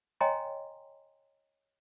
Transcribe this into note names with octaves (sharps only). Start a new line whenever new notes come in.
C#5 D#5 G5 G#5 A#5 C6